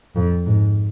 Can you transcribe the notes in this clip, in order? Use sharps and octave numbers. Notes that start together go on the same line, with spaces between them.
F2
G#2